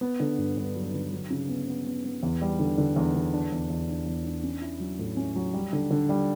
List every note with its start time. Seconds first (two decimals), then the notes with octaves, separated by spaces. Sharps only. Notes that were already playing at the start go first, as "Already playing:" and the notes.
0.01 B3
0.20 D3
0.38 G2
0.57 G2
0.76 F#3
0.93 D3
1.12 F#3
1.30 C#3
1.49 B3
1.68 B3
1.86 B3
2.05 B3
2.23 E2
2.41 G3
2.59 D3
2.78 D3
2.96 E2
3.14 D3
3.33 D4
3.52 E2
3.70 E2
3.88 D4
4.06 E2
4.25 D4
4.43 C#4
4.62 E4
4.80 F#3
4.99 A2
5.17 C#4
5.36 F#3
5.53 G3
5.73 D3
5.91 D3
6.09 G3